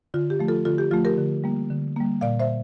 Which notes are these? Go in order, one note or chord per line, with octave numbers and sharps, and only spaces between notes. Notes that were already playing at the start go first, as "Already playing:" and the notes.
D3 F4
G4
F3 A3
F4 A4
D3 F4 A4
G4
F3 A3 F4
G4 A#4
D3
G3 A#3
D3
G3 A#3
A#2 D5 F5
C5 E5